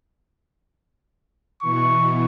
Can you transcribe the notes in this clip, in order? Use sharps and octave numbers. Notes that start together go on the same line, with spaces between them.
B2 E3 C#6